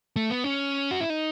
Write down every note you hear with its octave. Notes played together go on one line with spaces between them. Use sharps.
A3
B3
C#4
F#4
E4
D#4